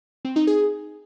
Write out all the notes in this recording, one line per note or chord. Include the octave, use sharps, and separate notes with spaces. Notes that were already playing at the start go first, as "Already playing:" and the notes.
C4
D#4
G#4